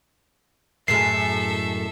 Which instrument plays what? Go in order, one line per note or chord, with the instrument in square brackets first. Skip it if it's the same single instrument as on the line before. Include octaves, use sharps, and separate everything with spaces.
[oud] F#2 A2 G#3 [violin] A4 E5 [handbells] C7